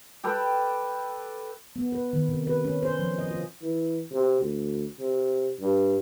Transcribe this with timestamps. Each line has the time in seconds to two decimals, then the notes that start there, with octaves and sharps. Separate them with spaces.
0.24 G4 A4 B4 G5
1.76 B3
1.92 B4
2.13 D#3
2.29 C3
2.47 B4
2.65 C#4
2.83 C5
2.99 F3
3.18 D#5
3.30 F4
3.62 E3
4.12 C3
4.41 D2
4.99 C3
5.60 G2